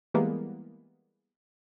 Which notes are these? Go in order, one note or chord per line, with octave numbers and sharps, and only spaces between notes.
E3 G3 G#3 A#3 B3